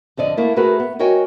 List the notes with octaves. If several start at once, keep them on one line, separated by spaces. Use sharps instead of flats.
F2 D3 D5 D#5
A3 A#3 E4
A3 F#4 G#4 A#4 B4
B3
F#4 A#4 C#5 D#5 G5 G#5